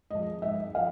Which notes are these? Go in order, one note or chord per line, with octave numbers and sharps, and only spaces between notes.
F3 G#3 D#5
G#2 E5
F3 F5